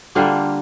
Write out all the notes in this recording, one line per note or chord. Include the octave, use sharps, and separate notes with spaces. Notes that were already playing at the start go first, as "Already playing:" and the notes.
D3 G3 A#3 F4 G4